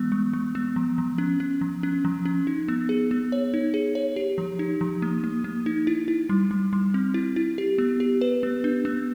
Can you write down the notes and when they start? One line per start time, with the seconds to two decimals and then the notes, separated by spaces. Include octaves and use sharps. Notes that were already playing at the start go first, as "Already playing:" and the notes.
Already playing: E3 G#3 B3
0.12 G#3
0.33 G#3
0.55 B3
0.76 F3
0.98 F3
1.18 C#4
1.40 C#4
1.61 F3
1.83 C#4
2.05 F3
2.25 C#4
2.47 D#4
2.68 B3
2.89 G#4
3.11 B3
3.32 C#5
3.54 D#4
3.74 G#4
3.95 C#5
4.16 G4
4.38 F3
4.59 D#4
4.81 F3
5.02 A#3
5.24 A#3
5.44 A#3
5.66 D#4
5.87 E4
6.08 E4
6.29 G3
6.51 G3
6.73 G3
6.94 C4
7.14 E4
7.36 E4
7.58 G4
7.78 B3
8.00 G4
8.21 B4
8.43 B3
8.64 D4
8.85 B3